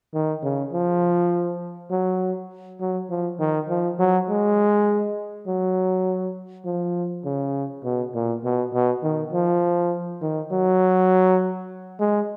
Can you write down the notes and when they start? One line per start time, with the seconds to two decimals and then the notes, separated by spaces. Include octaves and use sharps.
0.14 D#3
0.43 C#3
0.73 F3
1.91 F#3
2.80 F#3
3.10 F3
3.39 D#3
3.69 F3
3.99 F#3
4.29 G#3
5.47 F#3
6.65 F3
7.25 C#3
7.84 B2
8.14 A#2
8.44 B2
8.73 B2
9.03 D#3
9.33 F3
10.22 D#3
10.51 F#3
12.00 G#3